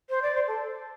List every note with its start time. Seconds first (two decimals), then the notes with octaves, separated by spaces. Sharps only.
0.10 C5
0.22 D5
0.35 C5
0.47 A4